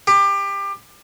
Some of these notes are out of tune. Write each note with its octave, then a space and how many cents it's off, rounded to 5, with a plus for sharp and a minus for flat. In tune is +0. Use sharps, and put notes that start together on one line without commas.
G4 +25